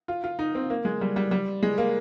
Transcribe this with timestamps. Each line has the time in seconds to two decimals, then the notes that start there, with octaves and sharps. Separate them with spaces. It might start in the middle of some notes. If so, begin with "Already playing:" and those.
0.08 F4
0.24 F4
0.39 D#4
0.55 C4
0.70 A#3
0.85 G#3
1.01 G3
1.16 G3
1.31 G3
1.63 G#3
1.78 A#3